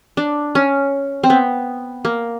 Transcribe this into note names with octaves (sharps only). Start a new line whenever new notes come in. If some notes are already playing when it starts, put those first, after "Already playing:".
D4
C#4
C4
B3
A#3